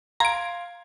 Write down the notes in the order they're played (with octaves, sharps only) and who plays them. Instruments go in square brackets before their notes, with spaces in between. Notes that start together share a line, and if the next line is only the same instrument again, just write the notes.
[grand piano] F5 C6 G#6 [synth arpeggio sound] A#5 D7